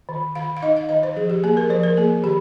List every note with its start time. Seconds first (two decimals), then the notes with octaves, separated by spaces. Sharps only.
0.09 D#3
0.35 D#3 F5
0.57 F5
0.62 D#4 D#5
0.76 F5
0.89 D#3 D#5
1.03 C5
1.16 F3 G#4
1.30 G4
1.44 A#3 G#4
1.57 A#4
1.70 F3 C5
1.84 A#4
1.97 A#3 G#4
2.24 D#3 G4